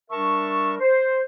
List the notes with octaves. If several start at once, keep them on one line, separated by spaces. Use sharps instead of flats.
G3 D4 A#4 E5 A5 C#6
C5